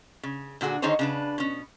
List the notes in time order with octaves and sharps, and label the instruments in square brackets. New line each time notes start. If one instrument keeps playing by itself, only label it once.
[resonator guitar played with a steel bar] C#3
A#2 D3 F#4 G#4
D3 D#3 D#4 G#4 C5 C#5
C#3 D4 B4
B2 C#4